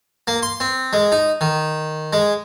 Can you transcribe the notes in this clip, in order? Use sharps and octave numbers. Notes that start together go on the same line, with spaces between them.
A#3
C6
C4
G#3
D#4
D#3
G#3